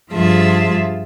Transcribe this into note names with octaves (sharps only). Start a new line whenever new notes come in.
G2 F3 F4 G#4 E5 A5